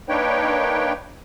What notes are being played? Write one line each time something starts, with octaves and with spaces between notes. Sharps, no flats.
A#3 D4 D#4 B4 C#5 G5